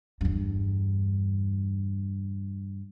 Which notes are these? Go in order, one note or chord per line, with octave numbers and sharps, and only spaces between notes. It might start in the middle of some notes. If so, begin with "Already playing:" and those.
E2 G2